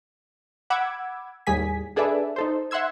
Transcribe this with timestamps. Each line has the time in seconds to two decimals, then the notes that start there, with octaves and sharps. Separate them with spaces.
0.70 F#5 B5 D6 E6 G#6
1.47 D#2 A2 G3 G#4 G#5 B6
1.96 D4 G#4 A4 B4 D5 E5
2.36 D#4 A4 C5
2.71 E5 F#5 C6 E6 G#6